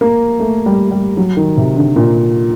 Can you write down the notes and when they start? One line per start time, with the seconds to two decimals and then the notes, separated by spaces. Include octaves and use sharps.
0.01 A#3
0.40 A3
0.66 G3
0.91 G3
1.17 F#3
1.37 D#3
1.57 C3
1.76 D3
1.96 A#2